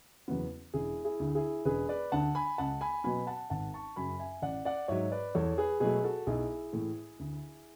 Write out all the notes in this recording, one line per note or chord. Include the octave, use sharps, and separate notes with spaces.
E2 C#3 F#3 B3
E1 E4 G#4
E4 G#4
D2 D3
E4 G#4
E1 G#4 B4
B4 D5
D2 D3 F#5 A5
G#5 B5
C#2 F#5 A5
G#5 B5
B2 F#3 B3 G#5 B5
F#5 A5
G#1 F#5 A5
A5 C#6
F#2 C#3 F#3 G#5 B5
E5 G#5
A1 D5 F#5
D5 F#5
G#2 F#3 C#5 E5
B4 D5
E2 A4 C#5
G#4 B4
B2 F#3 A3 G#4 B4
F#4 A4
B1 E4 G#4
A2 E3 A3
D2